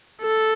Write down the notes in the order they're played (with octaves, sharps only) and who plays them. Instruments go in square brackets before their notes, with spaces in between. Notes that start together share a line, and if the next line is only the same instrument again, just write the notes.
[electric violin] A4